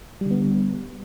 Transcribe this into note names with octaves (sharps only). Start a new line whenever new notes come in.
D3 G3 B3